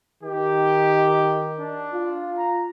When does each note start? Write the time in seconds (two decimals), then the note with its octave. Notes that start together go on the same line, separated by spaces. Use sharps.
0.23 D#3 G4
1.59 D4
1.93 F4
2.38 A#5